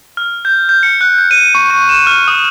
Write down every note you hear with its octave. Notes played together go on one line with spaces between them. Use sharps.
F6
G6
G6
C#7
F#6
G6
D#7
C#6
C#6
E7
F6
D#6